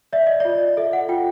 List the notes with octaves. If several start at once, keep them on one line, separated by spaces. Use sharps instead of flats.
D5 E5
D#5
F4 D5
D#5
A4 E5
F#5
F4 G5